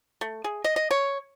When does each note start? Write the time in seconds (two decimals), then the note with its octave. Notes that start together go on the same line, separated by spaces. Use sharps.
0.21 A3
0.44 G#4
0.64 D#5
0.76 D#5
0.91 C#5